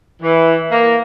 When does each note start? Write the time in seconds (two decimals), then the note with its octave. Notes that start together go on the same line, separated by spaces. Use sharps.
0.22 E3
0.71 A#3